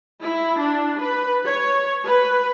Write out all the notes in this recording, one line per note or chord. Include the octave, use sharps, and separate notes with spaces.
E4
D4
B4
C#5
B4